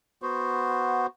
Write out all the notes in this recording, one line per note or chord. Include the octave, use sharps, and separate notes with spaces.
B3 F#4 C5